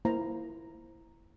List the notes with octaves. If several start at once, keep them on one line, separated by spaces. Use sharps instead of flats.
A#3 E4 C5 A#5